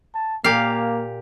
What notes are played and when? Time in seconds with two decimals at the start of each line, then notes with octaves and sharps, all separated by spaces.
0.14 A5
0.44 A#2 A#3 G4 F5